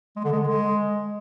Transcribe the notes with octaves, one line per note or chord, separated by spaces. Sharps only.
G#3
D3
G#3
D3
G#3